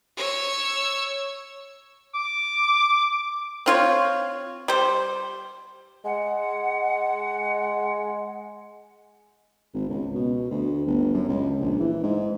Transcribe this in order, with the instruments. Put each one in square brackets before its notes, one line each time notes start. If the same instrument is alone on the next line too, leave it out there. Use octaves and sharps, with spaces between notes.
[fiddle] C#5 E6
[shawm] D6
[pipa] C4 F4 C#5
G3 C5
[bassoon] G#3 [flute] F#5
[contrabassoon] G#1
C#2
B2
D2
G1
F#2
C#2
A#1
E3
G#2